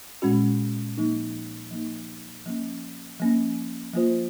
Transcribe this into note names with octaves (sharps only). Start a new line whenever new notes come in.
A#2 G#3 C#4 F#4
F3 A#3 D#4
F3 A#3 D#4
F3 A#3 C#4
F3 A#3 C#4
F3 A#3 F4 C5